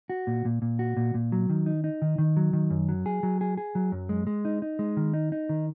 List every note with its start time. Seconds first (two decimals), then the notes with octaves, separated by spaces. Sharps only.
0.10 F#4
0.27 A#2
0.45 A#2
0.62 A#2
0.79 F#4
0.97 A#2
1.15 A#2
1.32 F#3
1.50 D#3
1.66 D#4
1.84 D#4
2.02 D#3
2.18 D#3
2.37 F#3
2.53 D#3
2.70 F#2
2.89 F#3
3.06 G#4
3.23 F#3
3.41 G#4
3.58 G#4
3.75 F#3
3.92 F#2
4.09 G#3
4.27 G#3
4.45 D#4
4.62 D#4
4.79 G#3
4.97 D#3
5.14 D#4
5.32 D#4
5.49 D#3